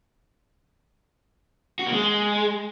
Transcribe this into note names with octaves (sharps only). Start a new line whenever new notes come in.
F#4
A#3
G#3